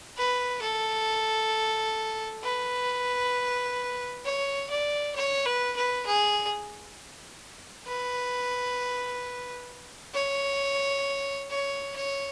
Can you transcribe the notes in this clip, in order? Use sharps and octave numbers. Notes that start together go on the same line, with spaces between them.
B4
A4
B4
C#5
D5
C#5
B4
B4
G#4
B4
C#5
C#5
C#5